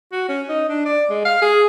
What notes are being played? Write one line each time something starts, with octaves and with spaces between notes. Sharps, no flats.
F#4
C#4
D#4
D4
D5
G#3
F5
G#4